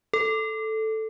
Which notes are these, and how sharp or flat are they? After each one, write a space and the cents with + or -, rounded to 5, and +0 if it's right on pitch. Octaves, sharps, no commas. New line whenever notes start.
A4 +0